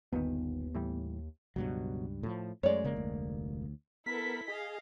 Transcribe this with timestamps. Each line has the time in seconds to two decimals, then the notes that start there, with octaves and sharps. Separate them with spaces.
0.13 G1 D#2 A#2 D#3 B3
0.75 A2 E3 G3
1.56 C#2 G2 B2 F#3
2.23 A2 F3
2.63 F#2 G#3 A3 C#5 D5
2.84 F1 C#3 G#3 A#3
2.96 D2
4.06 B3 E4 A4 A#4 B6
4.48 G#4 D#5 F5